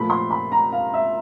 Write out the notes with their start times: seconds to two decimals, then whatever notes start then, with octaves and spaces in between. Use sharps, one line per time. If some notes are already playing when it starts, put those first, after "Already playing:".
Already playing: A#2 F3 A3 B5
0.10 C6
0.31 B5
0.52 A#5
0.72 F5
0.94 E5